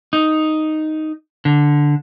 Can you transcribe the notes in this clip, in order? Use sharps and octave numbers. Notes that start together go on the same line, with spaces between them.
D#4
D3